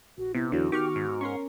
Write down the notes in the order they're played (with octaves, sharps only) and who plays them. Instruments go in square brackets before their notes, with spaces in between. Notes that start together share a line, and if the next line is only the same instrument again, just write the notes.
[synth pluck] A#1 [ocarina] F#4
[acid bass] C3 [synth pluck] B3 [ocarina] E4
[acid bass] E2 [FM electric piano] D3 E3 F#3 [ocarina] F#4
[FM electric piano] D#3 [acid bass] G4 [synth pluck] C#6 D6 F6
[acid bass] G#2
[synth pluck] C#4 A#4 [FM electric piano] C6 C#6